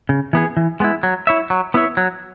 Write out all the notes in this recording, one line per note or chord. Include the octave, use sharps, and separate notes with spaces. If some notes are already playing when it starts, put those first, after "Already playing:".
C#3
E3 B3 G#4
E3
G#3 B3 E4
F#3
E4 C#5 E5
F#3
B3 E4 C#5 E5
F#3